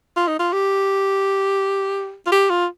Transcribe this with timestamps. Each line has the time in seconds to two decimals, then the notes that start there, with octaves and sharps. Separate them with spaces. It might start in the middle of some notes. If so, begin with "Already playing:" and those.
0.17 F4
0.28 D#4
0.39 F4
0.53 G4
2.27 F4
2.32 G4
2.50 F4